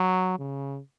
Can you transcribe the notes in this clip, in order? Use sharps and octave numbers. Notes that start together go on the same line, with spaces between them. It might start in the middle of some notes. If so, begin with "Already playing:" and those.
Already playing: F#3
C#3